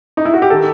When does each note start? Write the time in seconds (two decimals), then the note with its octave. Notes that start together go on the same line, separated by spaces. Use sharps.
0.17 D#4
0.25 E4
0.34 F#4
0.42 G4
0.50 D#3 A4